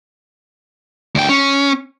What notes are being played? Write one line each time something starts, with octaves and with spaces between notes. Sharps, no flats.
D2 G5
C#4